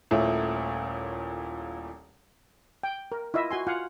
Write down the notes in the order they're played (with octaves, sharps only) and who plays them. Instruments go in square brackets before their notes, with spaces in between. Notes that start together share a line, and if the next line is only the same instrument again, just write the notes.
[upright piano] D#1 A#2 A3 E4 C#5
[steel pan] G5
A#4
E4 F4 D#5 E5
F#4 G#5 C6
F4 F5 F#5 G#5